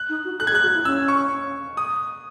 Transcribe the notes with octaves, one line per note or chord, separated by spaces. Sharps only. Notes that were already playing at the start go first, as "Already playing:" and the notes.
Already playing: F#6
D#4
F#4
A4 F#6
G#6
G#4
F#6
F#4
E4
C#4 E6
C#6
D#6